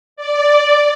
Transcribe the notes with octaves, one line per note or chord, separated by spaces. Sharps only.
D5